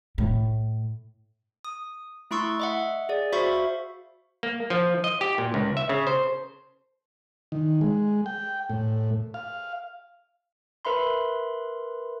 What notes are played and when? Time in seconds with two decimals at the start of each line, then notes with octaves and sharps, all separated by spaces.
0.18 A2
1.65 D#6
2.31 A3 E4 C6 C#6 E6
2.60 D#5 E5 F#5
3.09 G#4 D5
3.32 F#4 C5 E5 F5 B5 C#6
4.43 A#3
4.70 F3
5.04 D#5
5.21 G4
5.38 A#2
5.54 C#2
5.77 E5
5.89 C#3
6.07 C5
7.52 D#3
7.81 G#3
8.26 G5
8.70 A2
9.34 F5
10.85 A#4 B4 E5 B5 C6